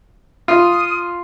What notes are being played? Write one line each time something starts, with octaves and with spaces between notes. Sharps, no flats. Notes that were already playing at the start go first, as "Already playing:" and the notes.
F4 D#6